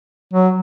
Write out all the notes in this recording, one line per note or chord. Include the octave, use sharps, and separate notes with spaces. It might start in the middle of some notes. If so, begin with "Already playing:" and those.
F#3